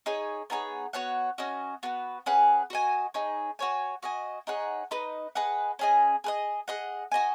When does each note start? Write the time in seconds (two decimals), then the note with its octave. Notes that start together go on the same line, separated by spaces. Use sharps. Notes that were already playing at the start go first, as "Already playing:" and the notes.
0.06 D#4 G#4 C#5 G#5
0.50 B3 D#4 G#4 C#5
0.93 B3 F#4 C#5 F#5
1.38 C#4 F#4 D#5
1.83 B3 F#4 B4
2.26 C#4 G#4 B4 F#5
2.70 F#4 D#5 G#5
3.14 D#4 G#4 C#5
3.59 F#4 C#5 G#5
4.03 F#4 D#5 G#5
4.47 D#4 G#4 C#5 F#5
4.91 D#4 B4 D#5
5.35 G#4 B4 D#5 F#5
5.79 C#4 G#4 D#5 G#5
6.24 G#4 B4 D#5
6.68 G#4 D#5 F#5
7.12 F#4 D#5 G#5